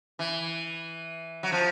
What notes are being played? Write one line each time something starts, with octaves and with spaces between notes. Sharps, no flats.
E3
F#3
F3